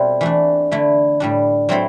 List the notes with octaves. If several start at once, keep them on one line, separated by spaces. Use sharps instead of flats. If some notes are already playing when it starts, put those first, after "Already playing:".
Already playing: B2 G3 C4 E4 A4
E3 A3 D4
D3 A3 E4
A2 G3 D4
F#3 C4 E4 A4 C5